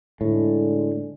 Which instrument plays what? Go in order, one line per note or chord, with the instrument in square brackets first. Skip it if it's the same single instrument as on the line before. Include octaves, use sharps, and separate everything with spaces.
[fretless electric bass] A2 [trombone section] D3 G#3